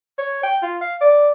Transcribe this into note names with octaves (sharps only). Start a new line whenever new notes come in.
C#5
G5
F4
F5
D5